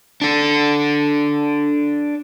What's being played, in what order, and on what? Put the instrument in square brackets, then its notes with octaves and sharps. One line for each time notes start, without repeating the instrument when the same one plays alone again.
[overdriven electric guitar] D4 A4